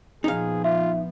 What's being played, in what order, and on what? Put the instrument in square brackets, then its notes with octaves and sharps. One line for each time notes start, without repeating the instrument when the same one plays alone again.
[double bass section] A#2 F3 B3 [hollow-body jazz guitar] D#4 F5 [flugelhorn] G#4
[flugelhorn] F4 [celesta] E5